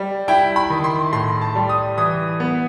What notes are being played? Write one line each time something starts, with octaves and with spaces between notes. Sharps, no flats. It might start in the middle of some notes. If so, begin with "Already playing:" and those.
Already playing: G3
E4 G5
B5
D#3
C6
A2 C6
A5
G3
D#6
E3 D#6
B3